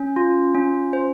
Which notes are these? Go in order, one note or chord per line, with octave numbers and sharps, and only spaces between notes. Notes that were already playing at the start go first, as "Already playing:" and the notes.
Already playing: C#4
F4
C#4
C5